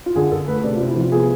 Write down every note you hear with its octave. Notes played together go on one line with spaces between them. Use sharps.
F4
D3 G#4
D3 A4
A3 B4
C3 D5
F4
C3
E4
F3 F4
B3 G#4